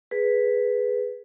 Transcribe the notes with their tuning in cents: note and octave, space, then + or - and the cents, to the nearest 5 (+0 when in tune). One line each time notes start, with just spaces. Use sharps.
G#4 +0 B4 +0